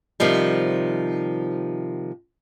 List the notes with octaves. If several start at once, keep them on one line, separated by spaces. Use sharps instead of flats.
C3 D#3 F3 G3